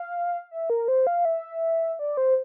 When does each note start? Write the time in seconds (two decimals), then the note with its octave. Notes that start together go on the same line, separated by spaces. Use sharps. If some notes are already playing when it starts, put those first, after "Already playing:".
Already playing: F5
0.51 E5
0.70 A#4
0.88 C5
1.07 F5
1.25 E5
1.99 D5
2.17 C5